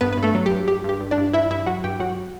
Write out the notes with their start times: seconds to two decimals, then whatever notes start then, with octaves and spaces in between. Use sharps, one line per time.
0.01 G2 B3 B4
0.13 G2 B4
0.23 A3 A4
0.35 F#3
0.46 G4
0.51 G2
0.68 G2 G4
0.84 G2 G4
1.01 G2
1.11 D4 D5
1.18 G2
1.33 G2 E4 E5
1.50 G2 E4 E5
1.66 F#3 F#4 F#5
1.84 G2 G4 G5
2.00 F#3 F#4 F#5